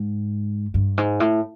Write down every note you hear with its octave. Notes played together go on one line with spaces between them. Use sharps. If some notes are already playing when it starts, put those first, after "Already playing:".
Already playing: G#2
G2
G#2
A2